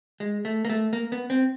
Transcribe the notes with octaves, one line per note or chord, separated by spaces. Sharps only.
G#3
A3
A#3
A3
A#3
B3
C4